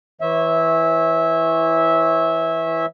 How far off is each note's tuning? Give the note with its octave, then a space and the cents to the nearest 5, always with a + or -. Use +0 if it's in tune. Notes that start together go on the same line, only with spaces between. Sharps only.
E3 +0 C#5 -25 E5 -15